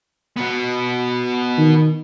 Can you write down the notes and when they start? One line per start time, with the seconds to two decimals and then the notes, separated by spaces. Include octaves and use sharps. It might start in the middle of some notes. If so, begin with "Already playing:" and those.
0.37 B2 B3
1.58 D#3